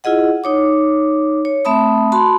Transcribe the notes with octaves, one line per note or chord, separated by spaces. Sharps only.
E4 F4 G#4 D#5 F#5
D#4 C#5 D6
C#5
A3 C4 E5 A5 B5 D#6
F#4 A5 B5 C6